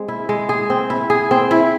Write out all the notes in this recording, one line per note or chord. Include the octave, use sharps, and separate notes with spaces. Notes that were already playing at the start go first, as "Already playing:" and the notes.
Already playing: G#3 C4
E4
G#3
G#4
C4
E4
G#4
C4
E4